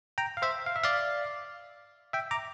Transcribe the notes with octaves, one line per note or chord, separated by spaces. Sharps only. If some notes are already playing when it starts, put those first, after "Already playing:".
G5 A#5
F5
C5 E5
F5
E5
D5 F5
E5 G5
A#5 D6